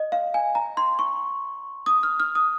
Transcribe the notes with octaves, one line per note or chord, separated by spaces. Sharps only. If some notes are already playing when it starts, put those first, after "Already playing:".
Already playing: D#5
F5
G#5
A#5
C6
C#6
D#6
F6
F6
D#6